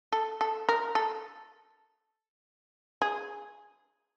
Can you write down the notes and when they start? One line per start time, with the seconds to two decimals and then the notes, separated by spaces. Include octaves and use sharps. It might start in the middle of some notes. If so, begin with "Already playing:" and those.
0.12 A4
0.41 A4
0.69 A#4
0.95 A4
3.02 G#4